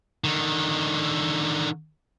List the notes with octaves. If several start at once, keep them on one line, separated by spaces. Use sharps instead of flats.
D3 D#3